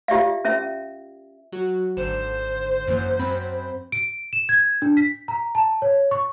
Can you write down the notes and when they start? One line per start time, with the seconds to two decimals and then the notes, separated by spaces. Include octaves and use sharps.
0.08 F4 G4 D5 E5 F5
0.45 C#4 A#4 E5
1.52 F#3 F#4
1.97 G#1 D3 C5 E7
2.87 F#2 E3 A#3
3.19 F#2 C4 B5
3.92 D7
4.33 E7
4.49 G#6
4.82 D4
4.97 B6
5.28 A#5
5.55 A5
5.82 C#5
6.11 C#6